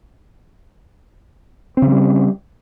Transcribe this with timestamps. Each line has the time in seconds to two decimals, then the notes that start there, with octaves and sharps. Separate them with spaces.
1.77 C4
1.82 C#3
1.87 F3
1.92 G3